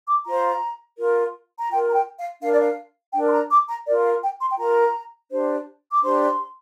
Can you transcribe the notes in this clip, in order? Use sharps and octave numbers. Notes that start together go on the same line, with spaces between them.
D6
F4 C5 A#5
F4 A#4
A#5
F4 A#4 G5
A#5
G5
F5
D4 A#4 F5
D5
F5
D4 A#4 G5
C6
A#5
D6
A#5
F4 A#4 D5
F5
G5
C6
G5
F4 A#4 A#5
D4 G4 C5
D6
D4 G4 C5 C6